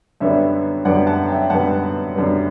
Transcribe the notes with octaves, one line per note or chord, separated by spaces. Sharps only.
F#2 D3 G3 B3 C#5 E5
F#2 D3 G3 B3 D5 F#5
F#5 A5
E5 G5
F#2 D3 G3 B3 F#5 A5
F#2 D3 G3 B3